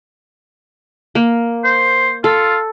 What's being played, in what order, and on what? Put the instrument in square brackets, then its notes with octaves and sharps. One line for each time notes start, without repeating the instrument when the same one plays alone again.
[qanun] A#3
[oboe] C5
[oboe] F4 [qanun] A4